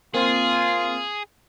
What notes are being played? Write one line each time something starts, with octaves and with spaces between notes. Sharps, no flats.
A#3 C4 F4 G#4